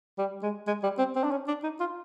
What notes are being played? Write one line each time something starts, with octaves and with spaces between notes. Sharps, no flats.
G3
G#3
G#3
G3
C4
C4
D4
C#4
D4
D#4
F4